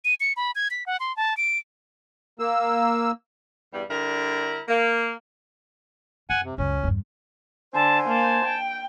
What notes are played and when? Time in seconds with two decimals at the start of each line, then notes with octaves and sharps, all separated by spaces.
0.05 D#7
0.20 C#7
0.37 B5
0.55 G#6
0.71 B6
0.86 F#5
1.00 C6
1.17 A5
1.37 D7
2.39 A#3 E6
3.73 E2 G2 G3
3.89 D3 G3 E4 A#4
4.68 A#3
6.30 F#2 F#5 G#5
6.44 C3
6.58 C#2 F#2 C#4
6.83 E2 G2
7.74 D3 C5 G#5 A5
8.08 A#3 A5
8.46 G5